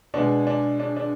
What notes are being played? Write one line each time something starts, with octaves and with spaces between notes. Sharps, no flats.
B2 G#3 D4
D4
D4
D4